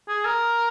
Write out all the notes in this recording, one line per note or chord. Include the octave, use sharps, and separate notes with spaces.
G#4
A#4